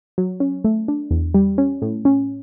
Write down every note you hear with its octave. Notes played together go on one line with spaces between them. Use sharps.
F#3
C#4
A3
D4
E2
G3
C#4
A2
C#4